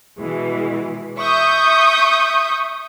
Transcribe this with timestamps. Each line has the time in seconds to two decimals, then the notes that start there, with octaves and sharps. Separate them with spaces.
0.19 B2 E3 G#3
1.20 E5 C#6 D#6 G6